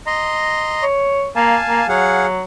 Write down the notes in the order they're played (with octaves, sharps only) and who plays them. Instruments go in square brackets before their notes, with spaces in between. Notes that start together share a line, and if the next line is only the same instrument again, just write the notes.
[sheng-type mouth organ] D#5 A#5 C6
[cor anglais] C#5
[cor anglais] A#3 [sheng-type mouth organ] F5 G#5 A5
[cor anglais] A#3
[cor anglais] F#3 [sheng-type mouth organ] G#4 F5 F#5